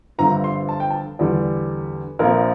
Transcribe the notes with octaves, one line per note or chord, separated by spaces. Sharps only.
G1 G2 D3 F3 C4 A#5
C6
A5
G5
A5
E2 D3 G3 D5
A#1 A#2 F3 C4 A#4